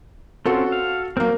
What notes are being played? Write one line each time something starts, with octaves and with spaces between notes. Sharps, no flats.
C4 C#4 F4 F#4 A4
F5
F#3 A#3 C4 A#4